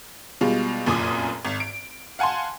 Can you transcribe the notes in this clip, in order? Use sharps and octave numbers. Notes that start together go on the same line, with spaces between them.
B2 G3 G#3 F4
F1 F#2 A#2 G#5 D6 D#6
G#1
D7
F5 F#5 G#5 A5 C6